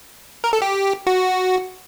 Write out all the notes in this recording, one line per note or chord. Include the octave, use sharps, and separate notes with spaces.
A#4
A4
G4
F#4